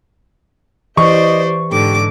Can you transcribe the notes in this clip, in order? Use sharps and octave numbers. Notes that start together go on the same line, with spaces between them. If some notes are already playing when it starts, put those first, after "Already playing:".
E3 G4 C5 D5 D#5 C#6
G#2 D3 G4 D6